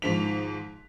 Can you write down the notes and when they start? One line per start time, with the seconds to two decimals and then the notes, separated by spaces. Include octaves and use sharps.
0.02 G#2 D#3 F3 B6 F7